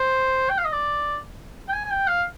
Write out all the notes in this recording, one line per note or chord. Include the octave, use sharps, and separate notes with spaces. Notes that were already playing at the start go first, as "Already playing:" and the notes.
Already playing: C5
G5
F5
D#5
D5
G5
G#5
G#5
G5
F5